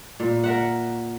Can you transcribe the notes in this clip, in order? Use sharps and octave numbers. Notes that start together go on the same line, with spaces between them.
A#2
A#4 E5 F#5